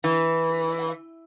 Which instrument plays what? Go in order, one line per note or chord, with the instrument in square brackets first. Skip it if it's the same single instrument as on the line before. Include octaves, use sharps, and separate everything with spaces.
[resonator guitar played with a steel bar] E3